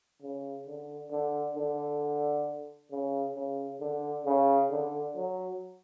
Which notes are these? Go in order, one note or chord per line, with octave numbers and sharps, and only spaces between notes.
C#3
D3
D3
D3
C#3
C#3
D3
C#3
D3
F#3